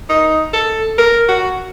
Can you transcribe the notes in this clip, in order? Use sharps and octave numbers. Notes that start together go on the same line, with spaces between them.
D#4
A4
A#4
F#4